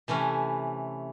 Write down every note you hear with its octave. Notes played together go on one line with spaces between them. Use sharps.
C3 E3 A3 C#4